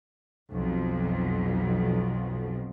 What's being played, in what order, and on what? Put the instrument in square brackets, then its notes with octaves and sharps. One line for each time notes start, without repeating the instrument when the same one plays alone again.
[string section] B1 F2